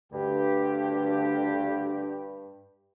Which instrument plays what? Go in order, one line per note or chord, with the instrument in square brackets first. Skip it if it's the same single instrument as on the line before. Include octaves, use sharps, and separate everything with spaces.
[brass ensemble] D2 D3 G4 [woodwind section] G2